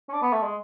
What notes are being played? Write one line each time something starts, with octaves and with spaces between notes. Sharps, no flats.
C#4
D4
B3
A3
G#3